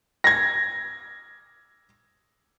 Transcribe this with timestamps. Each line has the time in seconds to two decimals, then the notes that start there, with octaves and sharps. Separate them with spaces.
0.24 G#6 A#6